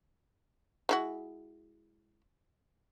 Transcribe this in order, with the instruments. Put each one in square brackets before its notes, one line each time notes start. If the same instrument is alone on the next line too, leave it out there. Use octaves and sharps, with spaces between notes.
[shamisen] G#3 E4 F#4